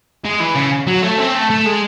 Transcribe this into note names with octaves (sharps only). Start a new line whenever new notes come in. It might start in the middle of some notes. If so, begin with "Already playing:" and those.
G#3
E3
C#3
F#3
A3
C4
A3
A3
G#3